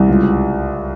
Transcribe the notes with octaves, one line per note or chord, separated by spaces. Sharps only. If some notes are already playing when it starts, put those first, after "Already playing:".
Already playing: C2
C#2